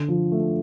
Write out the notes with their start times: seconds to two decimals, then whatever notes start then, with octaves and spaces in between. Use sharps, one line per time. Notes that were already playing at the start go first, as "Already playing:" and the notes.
Already playing: D3
0.08 F3
0.31 A3